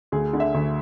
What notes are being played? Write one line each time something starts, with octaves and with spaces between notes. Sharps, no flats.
D2 G#4
D3
E5
D2